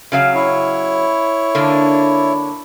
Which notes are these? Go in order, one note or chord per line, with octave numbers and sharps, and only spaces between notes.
C#3 F#3 F5
E4 C#5
D3 A#3 D4